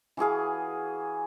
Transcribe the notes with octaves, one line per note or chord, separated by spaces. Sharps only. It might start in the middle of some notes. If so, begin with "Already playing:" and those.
E3 F#4 G#4 F5